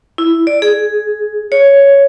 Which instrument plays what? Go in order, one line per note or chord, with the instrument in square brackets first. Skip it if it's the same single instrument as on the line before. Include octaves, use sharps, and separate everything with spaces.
[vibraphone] E4
D5
G#4
C#5